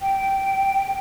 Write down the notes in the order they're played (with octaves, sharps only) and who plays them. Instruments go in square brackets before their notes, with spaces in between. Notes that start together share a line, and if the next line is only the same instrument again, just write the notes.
[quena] G5